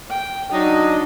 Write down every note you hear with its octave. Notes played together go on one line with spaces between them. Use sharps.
G5
F#3 D4 D#4 D#5